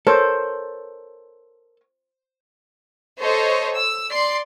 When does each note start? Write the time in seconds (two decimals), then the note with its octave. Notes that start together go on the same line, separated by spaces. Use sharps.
0.07 A4 A#4 C5 C#5
3.21 A4 C5 C#5 D#5
3.76 E6
4.11 D5 C6 C7